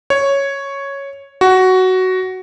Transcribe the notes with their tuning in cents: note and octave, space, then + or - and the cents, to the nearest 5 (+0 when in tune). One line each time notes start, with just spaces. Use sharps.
C#5 +0
F#4 +10